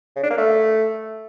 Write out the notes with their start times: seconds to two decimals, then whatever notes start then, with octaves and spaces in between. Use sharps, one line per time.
0.16 C#3
0.23 D4
0.30 A#3
0.38 A3